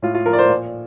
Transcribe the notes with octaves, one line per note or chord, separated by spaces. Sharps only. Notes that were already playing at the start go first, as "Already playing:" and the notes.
A2 F4
F4
F3 A#4
D5
C5
A#2